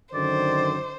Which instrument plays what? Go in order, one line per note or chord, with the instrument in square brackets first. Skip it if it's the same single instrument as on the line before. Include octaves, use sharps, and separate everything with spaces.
[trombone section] F#2 D3 D#3 [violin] C5 [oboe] D5